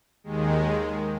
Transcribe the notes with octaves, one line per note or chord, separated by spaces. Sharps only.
D#2 D#3 G#3